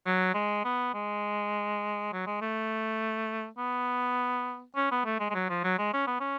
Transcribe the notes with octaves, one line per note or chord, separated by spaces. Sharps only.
F#3
G#3
B3
G#3
F#3
G#3
A3
B3
C#4
B3
A3
G#3
G#3
F#3
F3
F#3
G#3
C#4
B3
C#4